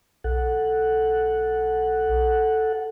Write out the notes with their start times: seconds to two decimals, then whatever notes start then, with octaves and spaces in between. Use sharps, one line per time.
0.24 B1 A4 F#5